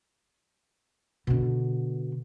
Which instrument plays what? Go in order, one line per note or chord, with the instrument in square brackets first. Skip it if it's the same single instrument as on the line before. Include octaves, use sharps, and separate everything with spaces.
[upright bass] B2 D3